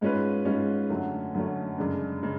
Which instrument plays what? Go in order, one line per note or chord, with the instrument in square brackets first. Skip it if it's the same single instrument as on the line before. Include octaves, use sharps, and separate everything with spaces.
[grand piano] G#2 G#3 C#4 F4 B4
G#2 G#3 C#4 F4 B4
F#2 D3 F#3 A3 C#4
F#2 D3 F#3 A3 C#4
F#2 C#3 G#3 D4
C#3 G#3